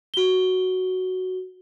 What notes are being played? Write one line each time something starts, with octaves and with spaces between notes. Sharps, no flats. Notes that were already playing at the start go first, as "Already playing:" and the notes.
F#4 G7